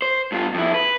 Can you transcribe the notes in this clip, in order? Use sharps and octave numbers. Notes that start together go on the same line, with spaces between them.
C5
G2 F4
F2 E4
B4